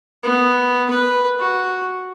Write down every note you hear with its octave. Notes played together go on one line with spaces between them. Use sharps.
B3
B4
F#4